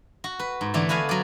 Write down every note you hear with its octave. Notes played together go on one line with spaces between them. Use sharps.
F#4
B4
G#2
D3 E3 A3 D4
B3 F#4 B4 F5 G#5
F#3 D5